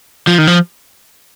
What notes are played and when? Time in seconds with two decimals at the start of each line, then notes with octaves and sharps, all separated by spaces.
0.27 F3
0.38 D#3
0.47 F3